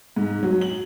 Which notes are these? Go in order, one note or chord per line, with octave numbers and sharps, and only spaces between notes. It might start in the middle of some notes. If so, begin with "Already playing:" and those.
G#2
F#3
F#7